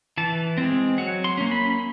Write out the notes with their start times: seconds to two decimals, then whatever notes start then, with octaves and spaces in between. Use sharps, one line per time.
0.18 E3 A5
0.58 G#3 C4
0.98 F#3 F#5
1.24 C6
1.37 A#3 C#4
1.51 B5